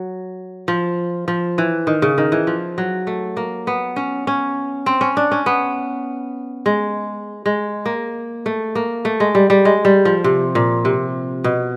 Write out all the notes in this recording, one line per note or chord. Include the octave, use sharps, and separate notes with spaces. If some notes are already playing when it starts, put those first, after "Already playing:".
Already playing: F#3
F3
F3
E3
D#3
C#3
D#3
E3
F3
F#3
A3
A#3
B3
C#4
C#4
C4
C#4
D4
C#4
B3
G#3
G#3
A#3
A3
A#3
A3
G#3
G3
G3
G#3
G3
F3
C3
A#2
C3
B2